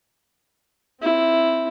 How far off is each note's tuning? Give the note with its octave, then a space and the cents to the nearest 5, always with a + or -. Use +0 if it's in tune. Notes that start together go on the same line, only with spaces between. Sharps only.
C4 +0 E4 +0